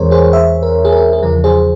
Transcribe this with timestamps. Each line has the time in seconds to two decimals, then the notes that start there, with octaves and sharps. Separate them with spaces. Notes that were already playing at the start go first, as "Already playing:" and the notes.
Already playing: E2 E3 G#3 C4 G#4 A#4 C5 C#5
0.11 G#4 C5
0.33 C5 E5
0.63 A#4
0.85 G#4
0.92 A#4
1.13 G#4
1.23 E2 C#3 F3 A#4
1.44 G#4 C5